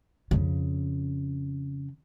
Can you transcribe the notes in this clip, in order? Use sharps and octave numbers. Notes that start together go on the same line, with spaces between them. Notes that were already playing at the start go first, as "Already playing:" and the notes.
F2 C#3